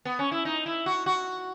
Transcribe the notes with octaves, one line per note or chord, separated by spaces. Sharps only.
B3
C#4
E4
D#4
E4
F#4
F#4